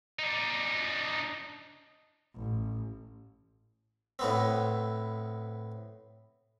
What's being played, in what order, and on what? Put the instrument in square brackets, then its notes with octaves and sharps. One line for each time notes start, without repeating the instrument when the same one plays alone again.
[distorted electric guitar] D4 D#4
[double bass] A1
[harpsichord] A2 B3 C4